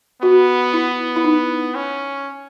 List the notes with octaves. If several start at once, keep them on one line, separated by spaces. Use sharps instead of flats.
B3 F#4
E4
E4
D#4
C#4